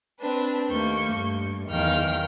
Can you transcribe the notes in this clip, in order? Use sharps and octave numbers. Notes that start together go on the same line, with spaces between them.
C4 D4 B4
D#2 A3 A#3 C#6 G6
G2
E2 D#3 F#3 F5 G5 F6